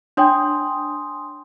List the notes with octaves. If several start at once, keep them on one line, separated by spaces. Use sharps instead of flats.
D4 C#5 G5 G#5 C6 D#6